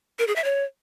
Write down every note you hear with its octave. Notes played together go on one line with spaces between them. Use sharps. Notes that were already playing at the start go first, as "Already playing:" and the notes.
A#4
G#4
E5
C#5